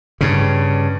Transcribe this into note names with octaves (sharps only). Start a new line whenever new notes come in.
G2 C#3